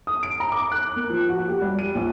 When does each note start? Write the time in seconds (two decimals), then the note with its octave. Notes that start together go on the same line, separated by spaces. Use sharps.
0.07 D#6
0.23 D7
0.40 A#5
0.52 D6
0.72 F#6
0.96 A#3
1.10 F3
1.29 F#4
1.48 G4
1.62 G3
1.79 D#7
1.95 A#1